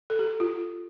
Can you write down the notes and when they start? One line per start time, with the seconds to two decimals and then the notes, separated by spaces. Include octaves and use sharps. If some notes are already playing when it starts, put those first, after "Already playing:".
0.10 A4
0.19 G4
0.40 F4